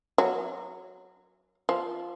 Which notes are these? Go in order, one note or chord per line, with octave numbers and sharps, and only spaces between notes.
F#3
F3